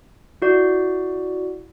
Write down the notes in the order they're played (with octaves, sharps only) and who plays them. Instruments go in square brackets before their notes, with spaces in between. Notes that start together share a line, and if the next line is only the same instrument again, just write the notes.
[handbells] E4 F#4 D5